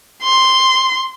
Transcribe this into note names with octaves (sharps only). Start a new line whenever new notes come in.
C6